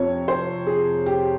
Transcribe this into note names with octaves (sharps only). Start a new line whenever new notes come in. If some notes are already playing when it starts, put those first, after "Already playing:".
Already playing: F2 C3 C#5
C5
G#4
G4